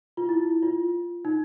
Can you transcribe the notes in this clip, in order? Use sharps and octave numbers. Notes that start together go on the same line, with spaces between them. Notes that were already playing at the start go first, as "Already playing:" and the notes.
F4
E4
F4
D#4